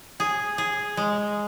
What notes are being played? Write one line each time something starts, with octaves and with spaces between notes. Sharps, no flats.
G#4
G#4
G#3